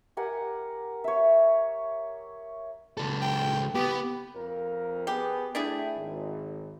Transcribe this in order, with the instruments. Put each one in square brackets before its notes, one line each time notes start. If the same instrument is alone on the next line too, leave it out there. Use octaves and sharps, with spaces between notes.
[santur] G4 A#4 F#5 G#5
C#5 E5
[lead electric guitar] C#2 A4
[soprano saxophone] G5
[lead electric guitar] B3 [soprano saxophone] G4
[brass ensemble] F2 A#4
[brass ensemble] B3 G#4 [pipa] G4
[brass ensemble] A3 G5 [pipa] D4 E4 G#4
[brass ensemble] G#1